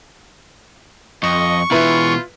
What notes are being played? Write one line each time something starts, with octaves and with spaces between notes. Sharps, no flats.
F2 D#5 C#6
B2 E3 E4 F4 B4